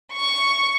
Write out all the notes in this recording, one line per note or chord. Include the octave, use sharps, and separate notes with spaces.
C#6